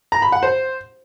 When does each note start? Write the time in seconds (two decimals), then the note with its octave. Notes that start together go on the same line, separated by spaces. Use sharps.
0.12 A#5
0.22 B5
0.32 F#5
0.43 C5